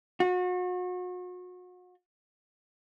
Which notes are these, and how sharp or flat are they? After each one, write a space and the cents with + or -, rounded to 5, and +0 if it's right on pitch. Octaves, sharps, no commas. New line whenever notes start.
F#4 -35